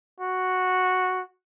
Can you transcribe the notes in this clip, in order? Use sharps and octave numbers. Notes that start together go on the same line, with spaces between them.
F#4